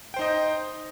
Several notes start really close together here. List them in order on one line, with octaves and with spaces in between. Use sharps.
G5 C5 D#4 D#5